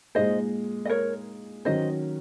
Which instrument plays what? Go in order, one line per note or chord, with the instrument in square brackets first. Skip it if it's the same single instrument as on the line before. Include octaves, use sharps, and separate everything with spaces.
[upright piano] A#2 G#3 D#4 G#4 [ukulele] C5 D#5
[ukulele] D#5
A#4 C#5
[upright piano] D#3 F#3 C#4 [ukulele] C5 D#5